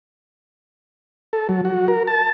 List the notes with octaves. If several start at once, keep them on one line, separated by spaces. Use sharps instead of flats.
A4
F#3
F#4
A#4
A5